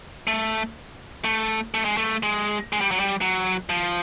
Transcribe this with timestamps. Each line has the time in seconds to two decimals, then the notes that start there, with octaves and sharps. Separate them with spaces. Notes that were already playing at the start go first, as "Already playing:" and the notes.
0.27 A3
1.25 A3
1.74 A3
1.85 G#3
1.97 A3
2.23 G#3
2.72 G#3
2.81 G3
2.91 F#3
3.00 G3
3.21 F#3
3.70 F3